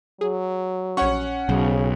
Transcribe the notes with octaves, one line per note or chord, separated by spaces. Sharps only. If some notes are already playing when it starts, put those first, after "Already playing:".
F#3 G#4
A#1 C#4 C#5 F#5 C#6
B1 C#3 C5